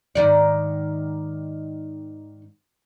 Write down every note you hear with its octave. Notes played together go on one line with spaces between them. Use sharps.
G#2 D#3 D5